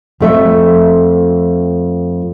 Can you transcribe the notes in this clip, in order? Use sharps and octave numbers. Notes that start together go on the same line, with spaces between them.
F2 A3 E5